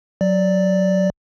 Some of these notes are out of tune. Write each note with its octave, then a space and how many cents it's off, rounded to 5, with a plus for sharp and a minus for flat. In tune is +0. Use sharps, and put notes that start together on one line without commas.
F#3 +0 D5 +0